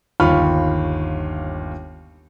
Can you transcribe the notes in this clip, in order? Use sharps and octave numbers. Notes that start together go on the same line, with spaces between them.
G1 D#2 F4 B5 C#6 F6